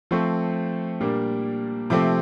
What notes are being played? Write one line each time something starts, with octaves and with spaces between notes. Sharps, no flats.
F3 A3 C4 C#6
A#2 G3 A#3 D4
C3 F3 A3 C4 D6